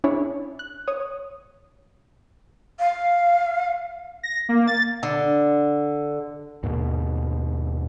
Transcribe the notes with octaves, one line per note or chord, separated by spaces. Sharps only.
C#4 D4 E4 G#4 C#5
F#6
C#5 D#6
F5
A#6
A#3
A6
D3
D#2 G#2 B2